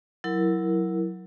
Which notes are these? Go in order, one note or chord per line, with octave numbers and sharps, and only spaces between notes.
F#3 E4 A#4